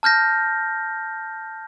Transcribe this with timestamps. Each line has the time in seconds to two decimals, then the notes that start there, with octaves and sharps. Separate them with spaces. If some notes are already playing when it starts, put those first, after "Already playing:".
0.03 A5 F6 G6 A#6